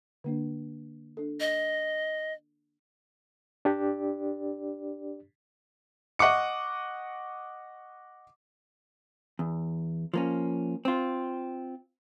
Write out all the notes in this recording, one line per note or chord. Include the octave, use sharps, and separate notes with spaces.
D3 A#3 D4
D4 A4
D#5
D4 G4 D5
D#5 F#5 C#6 D6 C#7
E2
F3 A#3 C#4
C4 F4